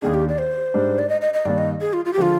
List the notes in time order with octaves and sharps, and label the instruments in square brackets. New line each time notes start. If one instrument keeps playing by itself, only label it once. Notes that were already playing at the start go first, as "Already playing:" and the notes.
[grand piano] D#2 D#3 A#3 D4 [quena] G#4
[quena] G4
D5
C5
[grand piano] G#2 G3 D4
[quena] D5
D#5
D#5
D#5
[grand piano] G2 D#3 G3 A#3 [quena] D5
[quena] D#5
G#4
F4
F4
G4
[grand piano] D3 F3 G#3 [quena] F4